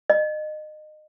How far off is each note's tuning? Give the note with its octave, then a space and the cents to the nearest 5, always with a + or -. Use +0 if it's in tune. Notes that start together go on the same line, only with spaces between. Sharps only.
D#5 -25